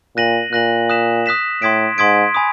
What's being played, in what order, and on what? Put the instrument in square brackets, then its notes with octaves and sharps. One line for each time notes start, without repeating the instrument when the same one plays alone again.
[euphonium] A#2 [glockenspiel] F#6 A#6 D#7 F#7
[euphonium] A#2 [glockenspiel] F#6 A#6 D#7 F#7
[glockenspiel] D#6 F#6 B6 E7
D#6 F#6 B6 E7
[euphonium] A2 [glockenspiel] C6 D#6 G#6 B6 D7
[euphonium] G#2 [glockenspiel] C6 D#6 G#6 B6 D7
[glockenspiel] G#5 B5 D#6